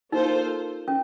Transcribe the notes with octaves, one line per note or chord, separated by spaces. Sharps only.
A#3 D#4 F4 A4 C5
C#4